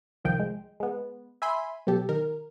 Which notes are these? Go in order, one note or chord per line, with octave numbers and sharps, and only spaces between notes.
C2 D#3 F3 G5
G#3
G#3 B3
E5 G#5 B5 C6
B2 F#3 G4 A4
D#3 A#4